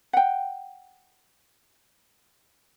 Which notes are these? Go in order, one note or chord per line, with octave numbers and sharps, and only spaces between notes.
F#5 G5